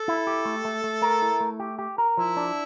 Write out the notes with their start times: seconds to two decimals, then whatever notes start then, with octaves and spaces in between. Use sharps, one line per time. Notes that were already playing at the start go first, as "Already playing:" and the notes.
Already playing: A4
0.08 E4
0.27 G4
0.45 A3
0.65 A3
0.84 A3
1.02 A#4
1.22 E4
1.41 A3
1.60 G4
1.79 G4
1.98 A#4
2.17 F3 E4
2.37 D4